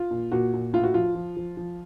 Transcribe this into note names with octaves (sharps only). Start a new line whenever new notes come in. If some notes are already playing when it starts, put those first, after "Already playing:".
Already playing: F4
A#2
A#2 F#4
A#2
A2 F4
F#4
F3 F4
F3
F3
F3